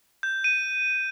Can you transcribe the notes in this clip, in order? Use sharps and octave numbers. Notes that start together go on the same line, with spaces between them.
G6
D#7